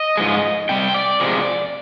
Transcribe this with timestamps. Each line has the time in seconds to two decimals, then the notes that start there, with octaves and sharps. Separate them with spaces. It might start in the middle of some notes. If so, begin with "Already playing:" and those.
Already playing: D#5
0.17 G#2 F3 G#3
0.69 C3 G3 G5
0.94 D5
1.20 C3 F3 G#3